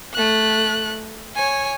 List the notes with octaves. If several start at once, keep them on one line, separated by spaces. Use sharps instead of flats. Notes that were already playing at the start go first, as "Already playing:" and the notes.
A3 F#6
C#5 G#5